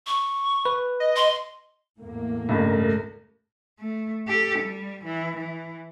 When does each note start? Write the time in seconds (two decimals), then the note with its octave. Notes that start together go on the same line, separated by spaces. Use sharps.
0.07 C#6
0.65 B4
1.00 D#5
1.16 C6
1.99 E2 A2 A#3
2.49 C#2 G2 A3 A#4
3.79 A3
4.28 G4 A4
4.59 G3
5.04 E3
5.36 E3